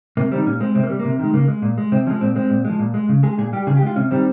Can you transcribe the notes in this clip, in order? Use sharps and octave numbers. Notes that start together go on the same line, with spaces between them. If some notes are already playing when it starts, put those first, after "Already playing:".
C3 A#3
D#3 G3 C4
A#2 C#4
G#3 C4
C3 C4
A#3
G3
A#3
C3
D#3 G#3
C#3 A#3
G#3
A#2
G#3
C3 C4
F3 G#3 C#4
A#2 C4
G#3 C4
A#2
F3 G#3
A#2
G#3
C#3
G#3 G#4
A#2 G#4
G3 G4
C#3 G#4
G4
G#3 F4
C3 C#4
D#3 G3 C4